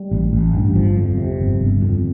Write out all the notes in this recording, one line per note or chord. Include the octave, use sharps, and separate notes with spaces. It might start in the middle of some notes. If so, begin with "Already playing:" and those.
Already playing: G3
A1
A1
G2
G1 F3
F2
C3
G1
G1
F2